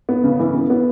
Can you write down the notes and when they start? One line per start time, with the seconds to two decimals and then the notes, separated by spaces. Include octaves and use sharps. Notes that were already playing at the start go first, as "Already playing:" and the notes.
0.09 B3
0.24 C#3
0.40 E3
0.54 B3
0.70 B3